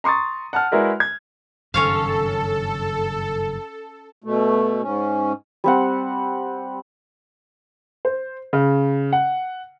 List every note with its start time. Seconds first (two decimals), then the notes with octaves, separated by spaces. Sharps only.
0.04 A#5 C6 C#6 D#6 A6
0.53 F#5 A5 F6
0.72 G#3 E4 F#4 A#4 B4 D5
1.00 G#6
1.74 F#1 G2 D#3 C#4 A4 C#5 F5
4.24 B2 A3
4.82 G#2 C#4
5.64 G3 C4 F#5
8.05 C5
8.53 C#3
9.13 F#5